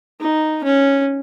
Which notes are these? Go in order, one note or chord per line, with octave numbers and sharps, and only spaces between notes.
D#4
C#4